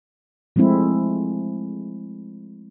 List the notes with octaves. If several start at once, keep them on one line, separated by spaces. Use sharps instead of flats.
F3 G#3 A3 C4 E4